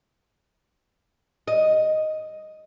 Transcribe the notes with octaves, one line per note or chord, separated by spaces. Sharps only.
D#5